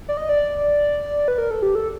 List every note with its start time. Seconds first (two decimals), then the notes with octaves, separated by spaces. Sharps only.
0.09 D5
0.17 D#5
0.29 D5
1.28 B4
1.38 A#4
1.51 A4
1.62 G4
1.75 A4